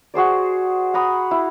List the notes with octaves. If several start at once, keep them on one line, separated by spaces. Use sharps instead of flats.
F#4 G#4 C5 D5
F#5 A#5 B5 D#6
E4